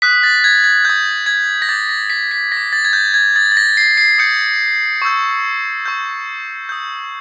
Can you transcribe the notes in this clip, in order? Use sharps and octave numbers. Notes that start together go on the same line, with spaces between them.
D#6 F#6 B6
A6
G#6
G#6
D#6 F#6 G6
G#6
A#6
D6 G6 A6
A#6
B6
B6
G6 A#6
D6
A6
G#6
G6
G#6
D#6 G6 A6
A6
A#6
C7
C7
D#6 G6 C#7
C#6 E6 G6
C#6 E6 G6
D#6 G6